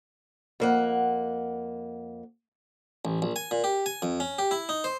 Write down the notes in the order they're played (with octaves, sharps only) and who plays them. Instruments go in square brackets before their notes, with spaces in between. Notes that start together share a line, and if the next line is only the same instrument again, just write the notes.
[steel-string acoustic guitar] F2 A#3 F#5
[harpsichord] A1
A#1
G#5
A#2
G4
G#5
F2
C#4
G4
E4
D#4
C5